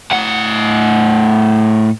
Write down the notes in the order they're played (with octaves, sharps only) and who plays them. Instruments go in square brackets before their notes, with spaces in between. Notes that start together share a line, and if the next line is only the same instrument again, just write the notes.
[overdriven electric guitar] A2 F#5